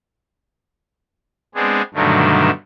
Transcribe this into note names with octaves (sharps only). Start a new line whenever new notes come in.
G#3 B3 C4 D4 G#4
G2 B2 D3 D#3 F#3 A3